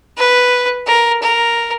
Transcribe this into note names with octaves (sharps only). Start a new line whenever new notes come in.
B4
A#4
A#4